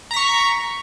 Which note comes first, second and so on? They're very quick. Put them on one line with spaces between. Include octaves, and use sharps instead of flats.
A#5 B6 C#6